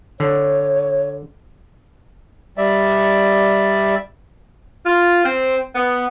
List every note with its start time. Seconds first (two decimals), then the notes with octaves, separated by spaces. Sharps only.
0.20 D3 C#5
2.58 G3 D5 E5
4.85 F4
5.24 C4
5.75 B3